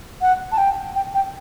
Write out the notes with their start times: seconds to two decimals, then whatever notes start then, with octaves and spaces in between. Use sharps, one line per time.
0.22 F#5
0.52 A5
0.58 G5
0.95 G5
1.15 G5